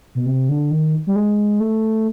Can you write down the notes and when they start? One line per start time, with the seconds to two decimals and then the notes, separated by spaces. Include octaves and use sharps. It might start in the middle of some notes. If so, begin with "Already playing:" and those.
0.15 B2
0.26 C3
0.49 D3
0.71 D#3
1.07 G3
1.16 G#3
1.60 A3